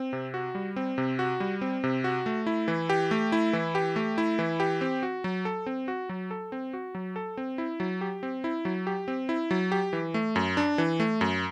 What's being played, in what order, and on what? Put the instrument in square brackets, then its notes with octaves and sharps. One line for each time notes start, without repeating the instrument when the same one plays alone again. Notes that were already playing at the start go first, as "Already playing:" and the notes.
Already playing: [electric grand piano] C4
C3
F#4
G3
C4
C3
F#4
G3
C4
C3
F#4
A3
E4
E3
G4
A3
E4
E3
G4
A3
E4
E3
G4
C4
F#4
F#3
A4
C4
F#4
F#3
A4
C4
F#4
F#3
A4
C4
E4
F#3
G4
C4
E4
F#3
G4
C4
E4
F#3
G4
E3
A3
F#2
D4
E3
A3
F#2